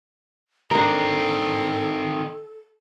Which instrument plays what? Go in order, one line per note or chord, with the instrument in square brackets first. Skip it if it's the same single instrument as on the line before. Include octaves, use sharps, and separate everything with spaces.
[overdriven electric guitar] D#3 C4 [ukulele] D4 A#4 [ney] A4